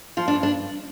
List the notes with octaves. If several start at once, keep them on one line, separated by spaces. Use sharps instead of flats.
F3 F4
D4
G2
D4